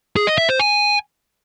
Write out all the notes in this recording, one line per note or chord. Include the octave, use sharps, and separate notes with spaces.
G#4
D#5
E5
C5
G#5